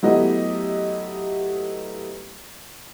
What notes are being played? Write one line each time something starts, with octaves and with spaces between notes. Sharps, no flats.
F#3 A3 B3 E4 G4 D#5